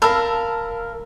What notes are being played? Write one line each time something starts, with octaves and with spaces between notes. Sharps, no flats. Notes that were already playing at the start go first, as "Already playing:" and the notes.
A#4 F5 A5 B5 E6